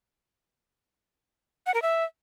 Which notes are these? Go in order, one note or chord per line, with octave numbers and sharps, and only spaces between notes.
F#5
A#4
E5